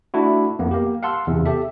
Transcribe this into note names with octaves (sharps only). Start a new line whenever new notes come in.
A3 D4 E4 F#4
F2 A#3 B3
A#3 G4
F5 F#5 A5 C6 E6
E2 C3
G4 A4 E5